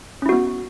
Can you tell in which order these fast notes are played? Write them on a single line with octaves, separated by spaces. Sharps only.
C#4 E4 F#4 B3